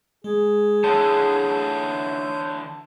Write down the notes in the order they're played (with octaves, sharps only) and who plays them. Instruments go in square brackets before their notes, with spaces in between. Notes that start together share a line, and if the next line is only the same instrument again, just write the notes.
[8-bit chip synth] G#3 [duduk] G#4
[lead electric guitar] D3 E3 [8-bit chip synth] C#5 G6 [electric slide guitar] A5